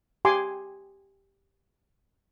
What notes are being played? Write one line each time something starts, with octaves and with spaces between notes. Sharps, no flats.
G4 G#5 C6 D6